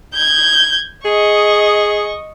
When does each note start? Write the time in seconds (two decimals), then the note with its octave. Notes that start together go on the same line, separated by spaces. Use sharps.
0.14 G6 G#6
1.05 G#4 D#5 C#6